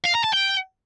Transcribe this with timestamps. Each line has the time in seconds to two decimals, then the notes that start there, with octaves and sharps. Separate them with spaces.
0.04 F5
0.14 A#5
0.23 A5
0.33 G5